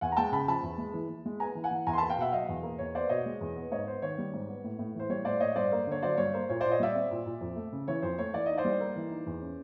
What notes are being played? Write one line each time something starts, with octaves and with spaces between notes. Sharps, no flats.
E2 F#5 G#5
A#5
G#3 G5 A5
C#3 A5 B5
F3 A5 B5
E2
G#3
E3
E3
G#3
B3 G#5 A#5
E3
F#5 G#5
E3
E2 G#5 A#5
C6
A#3 A5 B5
F5 G5
B2 E5 F#5
F#3 D#5 F5
E2
A#3
E2 C#5
B3 C5 D5
B2 C#5 D#5
G#3
E2
B3
G#2 C#5 D#5
B3 C5
D#3 C#5
G3
G#2
B3
A2
A2
E3 C5
G3 C#5
A2 C5 D5
A2 C#5 D#5
G2 C5 D5
A#3
D3 C#5
F#3 C5 D5
G2 C#5
A#3 C5
A#2 C#5
A#2 C5 D5
C#5 D#5
G3 D5 E5
C4
A#2
A#2
F2
A3
C#3
E3 C#5
F2 C5
A3 C#5
E3 D5
D#4 D#5
C5 D5
G3
A#3
E3
D#4
E2
C#4